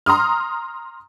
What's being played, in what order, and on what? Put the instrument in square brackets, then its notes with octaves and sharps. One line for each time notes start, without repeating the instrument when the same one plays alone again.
[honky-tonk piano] A#5 C6 D#6 F6